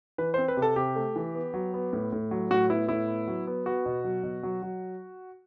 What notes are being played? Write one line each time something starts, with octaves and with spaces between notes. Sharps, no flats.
E3 B4
C4 C5
B4
C3
A4
C3 G4
A3
E3
B3
F#3
B3
A2
A2
F#3
A2 F#4
B3 E4
A2 E4
B3
F#3
B3
B3 F#4
B2
F#3
B2
F#3
F#3